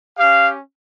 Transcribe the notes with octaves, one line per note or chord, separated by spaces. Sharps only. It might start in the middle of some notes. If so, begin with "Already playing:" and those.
C#4 G4 F5